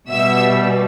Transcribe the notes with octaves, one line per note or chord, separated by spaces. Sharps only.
B2 G3 E5 E6